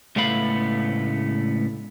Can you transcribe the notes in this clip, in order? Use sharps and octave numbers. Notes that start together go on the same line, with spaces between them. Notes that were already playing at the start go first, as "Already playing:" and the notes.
C#2 A2 A3 B3 F5 B5